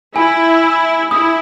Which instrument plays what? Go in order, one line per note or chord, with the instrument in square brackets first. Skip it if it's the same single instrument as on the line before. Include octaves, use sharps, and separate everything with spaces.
[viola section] E4 [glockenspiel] G#5
[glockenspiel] G#5
[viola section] E4 [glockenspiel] D#6